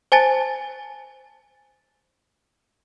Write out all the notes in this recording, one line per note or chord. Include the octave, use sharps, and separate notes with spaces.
C5 G#5 A5 A6